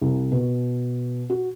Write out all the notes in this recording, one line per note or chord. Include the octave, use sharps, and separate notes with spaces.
C2
B2
F#4